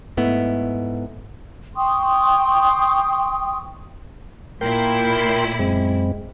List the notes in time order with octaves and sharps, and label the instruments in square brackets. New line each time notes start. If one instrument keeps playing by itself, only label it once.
[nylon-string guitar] G#2 A3 B3 E4
[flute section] G5 C6 C#6 D#6
[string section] A#2 E4 [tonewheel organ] A#4 G5 C6
[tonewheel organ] F#2 G#3 C4